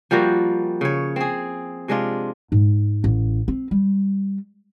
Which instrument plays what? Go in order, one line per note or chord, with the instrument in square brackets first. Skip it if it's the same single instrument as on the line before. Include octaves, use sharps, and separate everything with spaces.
[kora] F3 G3 A#3 F#4
C#3 C#5
C4 G#4
C3 G#3 D4 F4
[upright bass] G#2
A1
C4
G3